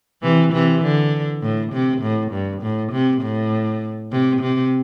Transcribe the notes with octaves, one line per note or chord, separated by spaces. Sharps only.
C3 E3
C3 E3
D3
A2
C3
A2
G2
A2
C3
A2
C3
C3